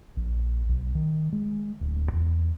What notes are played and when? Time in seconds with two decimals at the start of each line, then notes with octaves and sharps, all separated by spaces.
0.17 A#1
0.69 B1
0.95 D#3
1.33 G#3
1.81 D1
2.13 E2